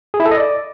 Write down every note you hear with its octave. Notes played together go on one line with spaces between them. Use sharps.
G#4
E4
A4
D#5
D5